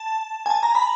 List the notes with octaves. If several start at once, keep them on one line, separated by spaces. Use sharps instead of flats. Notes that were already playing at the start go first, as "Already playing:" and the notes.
Already playing: A5
G#5
A5
A#5
B5